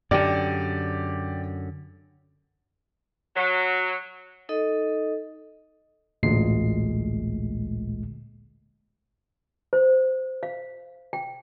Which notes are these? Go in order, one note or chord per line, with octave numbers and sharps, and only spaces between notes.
F#2 D3 G4 D5
F#3
D#4 A4 D#5
A1 D2 A#2 G#3 C7
C5
F5
G5